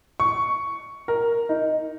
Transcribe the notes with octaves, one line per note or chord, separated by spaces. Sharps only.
C#6
A#4
D#4